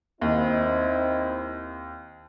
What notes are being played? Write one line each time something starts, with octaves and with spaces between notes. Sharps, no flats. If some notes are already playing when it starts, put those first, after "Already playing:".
D#2 C4 D#4 E4